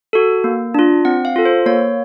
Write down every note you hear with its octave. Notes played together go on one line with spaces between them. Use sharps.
F#4 A4
A#3
D4 F4
C4 F#5
F5
F4 A4
C5
A#3 C#5